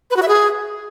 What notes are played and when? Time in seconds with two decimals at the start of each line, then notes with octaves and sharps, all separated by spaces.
0.11 B4
0.16 F#4
0.22 E5
0.28 G#4